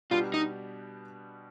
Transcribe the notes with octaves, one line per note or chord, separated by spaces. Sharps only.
B2 G3 B3 D4 F4 G4
D#4